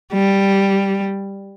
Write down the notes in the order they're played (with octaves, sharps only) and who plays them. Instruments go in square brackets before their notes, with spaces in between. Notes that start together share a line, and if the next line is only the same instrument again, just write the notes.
[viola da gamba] G3